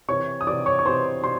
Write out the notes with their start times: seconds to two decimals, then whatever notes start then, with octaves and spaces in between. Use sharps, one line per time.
0.08 C3 E3 C#5 C#6
0.41 D#6
0.47 C3 E3 D5 D6
0.66 C#5 C#6
0.79 C#6
0.85 C3 E3 C5 C6
1.24 C3 C5 C6